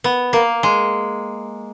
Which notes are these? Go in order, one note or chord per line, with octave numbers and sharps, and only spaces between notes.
B3
A#3
G#3